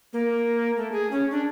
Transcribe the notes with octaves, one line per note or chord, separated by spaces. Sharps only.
A#3
A3
G#4
C#4
D4